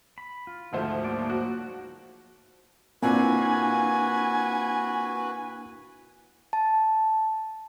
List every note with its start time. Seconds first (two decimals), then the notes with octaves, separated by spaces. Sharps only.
0.18 B5
0.47 F4
0.73 D2 G#2 F3 A3 C5
1.05 F#3 A#3 D5
1.30 F#4
3.03 A#2 A#3 C4 D4 E4 F#4 B4 G#5
6.53 A5